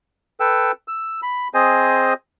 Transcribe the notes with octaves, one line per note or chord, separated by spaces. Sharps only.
A4 B4 G5 E6
E6
B5
C4 G#4 C5 D#5 G#5